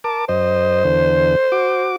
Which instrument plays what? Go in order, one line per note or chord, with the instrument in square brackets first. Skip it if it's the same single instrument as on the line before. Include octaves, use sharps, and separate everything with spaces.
[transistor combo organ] A#4 A5 D6
[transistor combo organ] F#2 D#5 [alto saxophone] C5
[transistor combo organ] E2 D3
F#4 D6